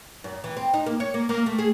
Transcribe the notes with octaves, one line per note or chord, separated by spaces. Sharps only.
F#2
E3
C4
D#4
A#3
C#5
A#3
A#3
A3
G#4